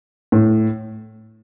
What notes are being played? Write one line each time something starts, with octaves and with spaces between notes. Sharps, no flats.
A2